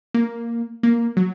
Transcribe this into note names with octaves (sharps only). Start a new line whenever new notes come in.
A#3
A#3
F#3